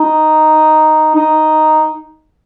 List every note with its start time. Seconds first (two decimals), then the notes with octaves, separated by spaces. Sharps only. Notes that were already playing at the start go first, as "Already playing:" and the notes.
Already playing: D#4
1.15 D#4